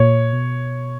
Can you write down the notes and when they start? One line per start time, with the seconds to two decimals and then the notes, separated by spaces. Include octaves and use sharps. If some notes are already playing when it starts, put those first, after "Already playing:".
Already playing: A#2 C#5
0.33 B2